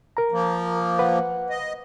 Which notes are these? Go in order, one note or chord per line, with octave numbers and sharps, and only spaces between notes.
A#4 A#5
F3 A#3
B4 F#5
D#5